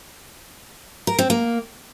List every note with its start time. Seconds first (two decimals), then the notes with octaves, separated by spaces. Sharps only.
1.07 A#4
1.19 C4
1.30 A#3